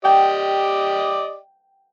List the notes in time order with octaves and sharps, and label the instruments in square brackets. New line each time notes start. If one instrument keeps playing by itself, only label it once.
[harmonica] G4 D5 D#5 [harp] G5